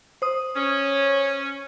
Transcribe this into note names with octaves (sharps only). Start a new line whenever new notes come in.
C5 D#6
C#4